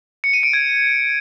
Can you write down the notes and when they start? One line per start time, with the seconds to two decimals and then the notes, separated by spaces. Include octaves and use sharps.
0.24 C#7
0.33 D#7
0.43 D7
0.53 G#6